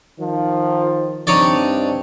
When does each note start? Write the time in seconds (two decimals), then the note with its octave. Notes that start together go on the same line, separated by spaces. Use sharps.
0.19 D#3 F3
1.27 G2 C4 D4 D#4 C#5 D5